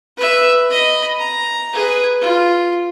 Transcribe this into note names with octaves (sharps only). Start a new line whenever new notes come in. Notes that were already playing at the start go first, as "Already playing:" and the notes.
B4 E5
D#5 B5
A#5
G#4 B4
F4